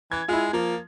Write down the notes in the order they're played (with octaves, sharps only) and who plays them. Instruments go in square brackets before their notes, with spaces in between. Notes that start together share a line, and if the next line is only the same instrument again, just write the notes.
[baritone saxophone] E3 [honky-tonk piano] G#6
[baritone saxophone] G#3 [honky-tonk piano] E4 F4
[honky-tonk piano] F3 [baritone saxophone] A#3